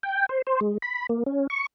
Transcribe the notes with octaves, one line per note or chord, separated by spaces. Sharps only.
G5
C5
C5
G#3
B5
A#3
C#4
C#6